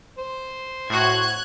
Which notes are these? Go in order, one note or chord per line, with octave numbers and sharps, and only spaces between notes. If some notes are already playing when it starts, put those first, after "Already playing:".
C5
A2 F#4 F#6 G#6